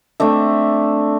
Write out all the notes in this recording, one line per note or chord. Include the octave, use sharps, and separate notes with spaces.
A3 C4 D4 E5